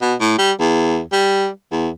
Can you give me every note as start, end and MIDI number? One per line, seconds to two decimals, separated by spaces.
0.01 0.14 47
0.20 0.34 45
0.39 0.52 55
0.60 1.00 40
1.12 1.48 55
1.72 1.89 40